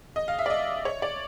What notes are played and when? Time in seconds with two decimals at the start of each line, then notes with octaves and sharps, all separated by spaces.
0.16 D#5
0.28 F5
0.39 E5
0.46 D5
0.50 D#5
0.85 C#5
1.02 D5